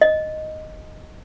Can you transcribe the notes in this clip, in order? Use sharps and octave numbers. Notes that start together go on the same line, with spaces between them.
D#5